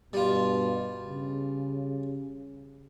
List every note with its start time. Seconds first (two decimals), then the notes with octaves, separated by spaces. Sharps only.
0.13 G2 B2 G3 F4
1.09 C#3